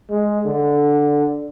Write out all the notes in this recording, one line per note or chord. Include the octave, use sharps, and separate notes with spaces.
G#3
D3